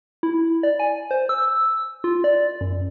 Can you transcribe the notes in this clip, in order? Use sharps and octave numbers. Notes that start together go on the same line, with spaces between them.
E4
D5
G#5
C5
E6
F4
D5
F#2